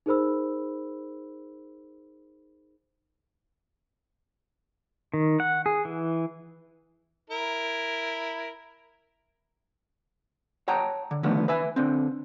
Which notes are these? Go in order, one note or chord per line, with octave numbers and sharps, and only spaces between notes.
D#4 G#4 A#4 C5 B5 E6
D#3
F#5
G#4
E3
E4 A#4
C#5 F#5 G5 A5 A#5
D3
B2 D3 D#3 F3 A3 B3
B4 E5 G#5
D3 C4